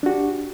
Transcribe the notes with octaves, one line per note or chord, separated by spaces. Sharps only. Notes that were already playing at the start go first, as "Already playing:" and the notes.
D4 F#4 G4